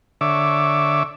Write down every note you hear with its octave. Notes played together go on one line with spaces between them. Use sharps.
D3 C#5 E5 D6